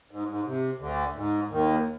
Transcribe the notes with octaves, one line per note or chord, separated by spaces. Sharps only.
G#2
G#2
C3
D2 D3
G#2
D#2 D#3